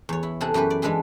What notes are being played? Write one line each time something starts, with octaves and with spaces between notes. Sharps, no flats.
E2 C#5
E4
C3 G#4 A4 F#5
F#2 E3 G4 B4
D5
E3 G#3 D4 E4 G#4